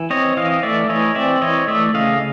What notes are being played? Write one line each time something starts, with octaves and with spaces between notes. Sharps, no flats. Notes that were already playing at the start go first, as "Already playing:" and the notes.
Already playing: E3
C4 C#5 D#5
E3 D#5 F5
A3 D5 E5
E3 C#5 D#5
C4 D5 E5
E3 C#5 D#5
A3 D5 E5
C#3 D#5 F5